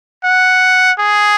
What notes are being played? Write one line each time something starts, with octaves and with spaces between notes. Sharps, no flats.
F#5
G#4